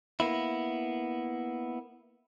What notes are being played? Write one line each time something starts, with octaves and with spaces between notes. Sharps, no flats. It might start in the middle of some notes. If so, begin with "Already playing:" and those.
A#3 B3 E4